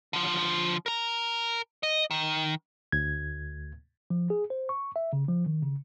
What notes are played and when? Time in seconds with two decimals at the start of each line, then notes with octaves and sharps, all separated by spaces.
0.13 D3 F3
0.86 A#4 A#5
1.83 D#5
2.11 D#3
2.92 D2 G#6
4.10 F3
4.30 G#4
4.50 C5
4.69 C#6
4.96 E5
5.13 C#3
5.28 F3
5.46 D#3
5.62 C#3